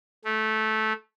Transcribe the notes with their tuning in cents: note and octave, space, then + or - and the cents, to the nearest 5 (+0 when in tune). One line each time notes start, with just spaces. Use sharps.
A3 -15